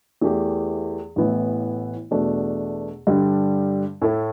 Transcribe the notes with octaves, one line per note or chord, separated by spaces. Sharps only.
E2 E3 A3 G4
A1 A2 E3 B3 E4
E2 B2 A3 D4
G2 D3 G3
A2 A3 E4 A4